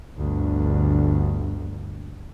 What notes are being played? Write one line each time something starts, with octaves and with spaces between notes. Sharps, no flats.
G1 D2